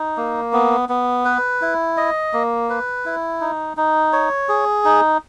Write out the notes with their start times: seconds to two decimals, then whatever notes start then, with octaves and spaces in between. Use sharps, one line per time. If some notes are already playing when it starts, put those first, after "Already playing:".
Already playing: D#4
0.17 A#3
0.53 B3
0.89 B3
1.25 B4
1.62 E4
1.97 D#5
2.33 A#3
2.70 B4
3.06 E4
3.41 D#4
3.77 D#4
4.13 C#5
4.49 G#4
4.85 D#4